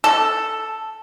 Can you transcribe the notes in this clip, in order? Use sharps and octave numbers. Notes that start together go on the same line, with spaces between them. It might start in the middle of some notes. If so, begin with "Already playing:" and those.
A4